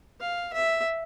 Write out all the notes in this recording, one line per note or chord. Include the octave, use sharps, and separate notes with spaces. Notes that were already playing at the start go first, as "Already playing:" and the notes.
F5
E5